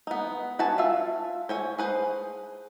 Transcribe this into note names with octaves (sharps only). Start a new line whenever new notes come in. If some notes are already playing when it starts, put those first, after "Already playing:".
B3 D#4
F#4 B4 G#5 A5
F4 E5
C5 C#5 G#5
G#4 B4 C5